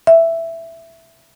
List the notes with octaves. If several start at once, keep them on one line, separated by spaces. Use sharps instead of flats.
E5